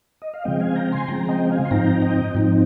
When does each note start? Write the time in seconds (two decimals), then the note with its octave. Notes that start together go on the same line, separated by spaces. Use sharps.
0.22 D#5
0.33 F5
0.44 C#3 F3 G#3 C4 D#5 G5
0.60 F5 G#5
0.76 G5 A#5
0.92 G#5 C6
1.07 C#3 F3 G#3 C4 G5 A#5
1.28 D#5 G5
1.50 F5 G#5
1.65 C6
1.71 G#2 F3 C4 D#4 G5 A#5
2.02 D#5 G5
2.34 G#2 F3 C4 D#4